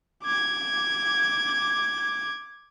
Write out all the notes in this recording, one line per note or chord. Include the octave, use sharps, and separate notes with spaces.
D6 G#6